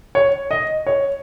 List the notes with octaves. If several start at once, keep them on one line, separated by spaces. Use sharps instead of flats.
C#5
D#5
C#5